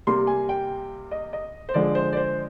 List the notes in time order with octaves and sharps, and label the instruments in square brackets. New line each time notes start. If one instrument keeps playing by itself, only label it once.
[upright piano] C3 G3 A#3 C6
G#5
G5
D#5
D#5
C5
D3 F3 G#3 D5
C5
D5
C5